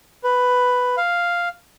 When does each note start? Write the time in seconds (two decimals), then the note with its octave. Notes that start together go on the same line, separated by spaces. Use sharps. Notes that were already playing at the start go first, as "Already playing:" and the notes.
0.24 B4
0.97 F5